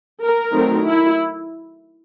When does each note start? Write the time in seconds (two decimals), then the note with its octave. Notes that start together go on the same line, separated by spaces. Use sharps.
0.22 A#4
0.52 D#3 F#3 A3 C4
0.83 E4